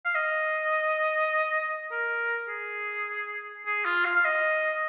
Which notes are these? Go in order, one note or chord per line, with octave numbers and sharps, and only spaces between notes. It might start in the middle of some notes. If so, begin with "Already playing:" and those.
F5
D#5
A#4
G#4
G#4
F4
F5
F5
D#5